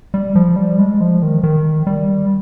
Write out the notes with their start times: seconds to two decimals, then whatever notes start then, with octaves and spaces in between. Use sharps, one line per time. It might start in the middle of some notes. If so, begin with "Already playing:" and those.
0.14 G3
0.35 F3
0.56 G3
0.79 G#3
1.01 F3
1.22 D#3
1.43 D#3
1.87 G3